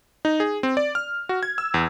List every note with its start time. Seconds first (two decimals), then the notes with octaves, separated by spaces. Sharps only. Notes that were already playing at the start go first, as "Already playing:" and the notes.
0.25 D#4
0.40 G#4
0.63 C4
0.77 D5
0.95 F6
1.29 F#4
1.43 G#6
1.58 E6
1.74 E2